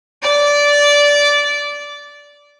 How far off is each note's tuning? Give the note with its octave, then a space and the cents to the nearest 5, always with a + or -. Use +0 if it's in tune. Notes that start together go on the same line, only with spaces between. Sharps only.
D5 -15